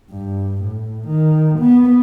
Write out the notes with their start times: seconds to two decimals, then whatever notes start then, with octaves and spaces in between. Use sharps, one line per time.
0.11 G2
0.63 A2
1.07 D#3
1.59 B3